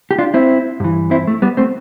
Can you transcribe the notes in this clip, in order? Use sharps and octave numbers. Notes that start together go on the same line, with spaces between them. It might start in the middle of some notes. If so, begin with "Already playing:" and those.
G4
D4 F4
C4 E4
G2 E3
C4 E4
A3
G3 B3
A3 C4